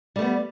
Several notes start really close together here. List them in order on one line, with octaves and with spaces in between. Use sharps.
G3 A3 B3